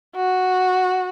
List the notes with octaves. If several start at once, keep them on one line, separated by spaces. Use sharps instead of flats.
F#4